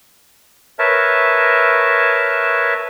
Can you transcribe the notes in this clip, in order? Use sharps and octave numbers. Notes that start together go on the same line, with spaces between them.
A#4 B4 C#5 E5 A5